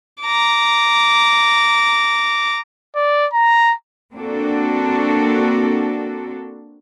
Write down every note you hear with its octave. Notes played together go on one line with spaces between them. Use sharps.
A#5 D6
D5
A#5
A#3 C4 D4 F#4 A4